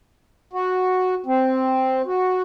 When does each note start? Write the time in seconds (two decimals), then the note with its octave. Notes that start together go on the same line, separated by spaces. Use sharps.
0.53 F#4
1.26 C4
2.06 F#4